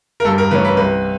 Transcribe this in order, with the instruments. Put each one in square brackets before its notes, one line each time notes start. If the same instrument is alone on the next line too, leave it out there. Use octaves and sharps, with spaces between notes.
[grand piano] A#4
G2 A4
A#4
E3 A3 C#4 B4
B4
C2 B4